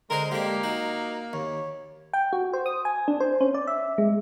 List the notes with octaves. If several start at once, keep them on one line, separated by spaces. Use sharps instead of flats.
D3 G#3 A#4 C5
G#3 A#3 D4 G4
D#4 F#4
D#2 C#5
G5
F#4
C5
D#6
G#5
D4
C5
C#4
D5
E5
G#3